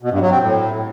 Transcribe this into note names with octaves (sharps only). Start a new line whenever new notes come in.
B2
G2
F#3
C4
A2